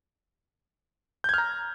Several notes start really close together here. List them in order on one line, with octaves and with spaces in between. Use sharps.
G6 G#6 F6 A#5